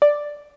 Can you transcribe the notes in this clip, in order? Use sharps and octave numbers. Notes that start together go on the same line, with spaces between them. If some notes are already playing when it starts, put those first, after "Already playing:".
D5